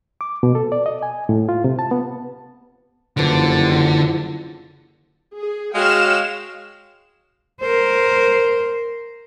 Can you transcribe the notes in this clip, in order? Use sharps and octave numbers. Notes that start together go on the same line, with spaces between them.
D6
B2
A4
D5
D#5
G#5
A2
F4
C3
A5
B3
F#1 G2 D3 E3 F3
G#4
G#3 F#4 C#5 F5 G5 F6 E7
A#4 C5